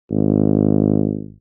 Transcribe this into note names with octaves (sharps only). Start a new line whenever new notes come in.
G#1